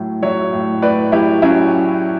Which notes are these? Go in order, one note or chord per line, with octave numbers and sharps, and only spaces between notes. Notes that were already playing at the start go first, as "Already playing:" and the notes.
Already playing: A2 F#3
F#3 C#5 E5
A2
A2 B4 D5
F#3 E4 G4
F#3 C#4 E4